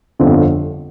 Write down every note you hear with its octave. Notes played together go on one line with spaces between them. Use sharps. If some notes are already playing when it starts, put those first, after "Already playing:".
G1 F2 D3 F3 C4